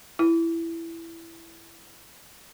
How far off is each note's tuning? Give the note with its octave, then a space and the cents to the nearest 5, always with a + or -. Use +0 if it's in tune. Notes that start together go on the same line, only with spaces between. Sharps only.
E4 +10